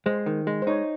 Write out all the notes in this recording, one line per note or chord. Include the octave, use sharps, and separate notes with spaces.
G#3 C5
D#3
G#3
C5
D#4 C#5